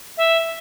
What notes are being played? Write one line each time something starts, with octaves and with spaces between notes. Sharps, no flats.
E5